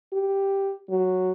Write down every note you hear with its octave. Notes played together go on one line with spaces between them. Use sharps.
G4
F#3